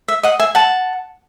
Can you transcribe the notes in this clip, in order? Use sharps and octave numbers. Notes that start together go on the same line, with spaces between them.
E5
D#5 F#5
E5 G#5
F#5 A5